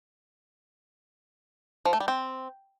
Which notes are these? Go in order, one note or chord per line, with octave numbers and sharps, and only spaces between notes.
F3
A3
G3
C4